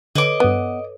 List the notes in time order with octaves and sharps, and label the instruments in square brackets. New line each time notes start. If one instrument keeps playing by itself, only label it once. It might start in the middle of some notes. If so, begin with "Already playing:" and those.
[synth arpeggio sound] D3 [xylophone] A4 B4 C#5 [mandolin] D#5 D6
[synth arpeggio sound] G2 D#6 [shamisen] B3